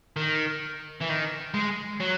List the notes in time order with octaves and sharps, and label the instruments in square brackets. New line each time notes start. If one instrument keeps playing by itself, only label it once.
[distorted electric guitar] D#3
E3
D#3
G#3
F#3